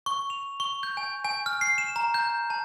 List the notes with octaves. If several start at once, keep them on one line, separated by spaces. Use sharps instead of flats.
C#6
F7
C#6
G6
G#5
G#5
F6
C7
E7
A#5
G6
A5